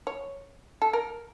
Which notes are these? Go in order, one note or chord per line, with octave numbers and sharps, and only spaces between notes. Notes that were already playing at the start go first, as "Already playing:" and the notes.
C#5
A4
A#4